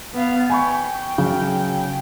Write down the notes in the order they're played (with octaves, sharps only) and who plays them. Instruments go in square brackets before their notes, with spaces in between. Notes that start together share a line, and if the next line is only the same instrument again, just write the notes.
[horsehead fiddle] B3 F5
[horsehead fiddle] G5 [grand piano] G#5 B5 C#6
[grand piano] C#3 F#3